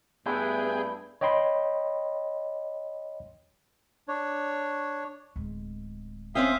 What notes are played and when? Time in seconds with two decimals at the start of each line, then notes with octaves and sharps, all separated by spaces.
0.26 G2 A3 B3 D4 E4 G#4 G5
1.21 C#5 D#5 G5 B5 C6
4.08 D4 C#5
5.36 D1 G#3
6.35 C4 C#4 E5 F5 G5 D#6